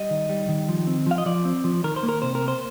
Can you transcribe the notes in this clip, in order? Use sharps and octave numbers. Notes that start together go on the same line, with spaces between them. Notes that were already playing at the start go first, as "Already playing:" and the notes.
Already playing: G3 D#5
D#3
G3
D#3
F3
C4
F3 F5
D#5
F3 D5
C4
F3
D#3 A#4
C5
A#3
A#4
C3 C5
A#4
A#3
C5